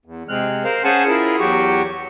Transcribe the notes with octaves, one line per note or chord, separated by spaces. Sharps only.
E2
C3 G#3 C4 F6 F#6
A#4 C5 F5
C#4 G#4 C5 F#5 G#5 A5
E4 F4 G#4 A#4
E2 F#3 F#4 G4 C#6